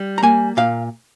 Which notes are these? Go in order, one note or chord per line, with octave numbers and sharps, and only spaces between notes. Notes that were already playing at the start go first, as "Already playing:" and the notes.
Already playing: G3
A#5
A#3 G#5
A#2 F5